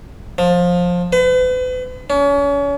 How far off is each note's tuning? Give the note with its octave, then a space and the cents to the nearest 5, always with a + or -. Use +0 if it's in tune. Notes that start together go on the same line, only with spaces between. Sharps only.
F3 +20
B4 +40
C#4 +35